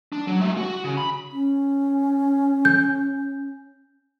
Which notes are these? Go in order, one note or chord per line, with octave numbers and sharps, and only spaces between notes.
D4
F#3
G#3 E5
F#4
C#3
B5
C#4
G6